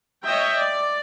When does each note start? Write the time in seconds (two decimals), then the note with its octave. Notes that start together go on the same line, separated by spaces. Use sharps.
0.24 C#5 D#5 E5 G5
0.55 D5